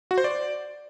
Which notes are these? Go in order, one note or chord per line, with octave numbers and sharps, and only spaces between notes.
F#4
C5
D5